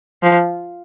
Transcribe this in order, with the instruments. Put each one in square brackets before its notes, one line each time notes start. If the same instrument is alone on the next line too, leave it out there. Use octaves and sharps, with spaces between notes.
[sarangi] F3